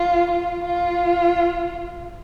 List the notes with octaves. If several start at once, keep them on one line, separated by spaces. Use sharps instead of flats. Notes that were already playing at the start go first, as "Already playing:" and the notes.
Already playing: F4
F4
F4